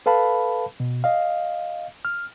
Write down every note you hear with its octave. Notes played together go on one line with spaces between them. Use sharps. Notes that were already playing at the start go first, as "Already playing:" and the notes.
A4 B4 F5 A5 B5
B2
D#5 F5
F6